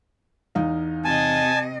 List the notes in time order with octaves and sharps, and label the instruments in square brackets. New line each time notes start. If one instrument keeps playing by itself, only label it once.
[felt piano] E2 D#4 F5
[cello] C3 D#5 [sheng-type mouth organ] G#5 A5